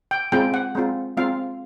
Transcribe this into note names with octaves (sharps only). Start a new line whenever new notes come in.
G5
G#3 C4 F4 G5
F#5
G#3 C4 F4
G#3 C4 F4 F5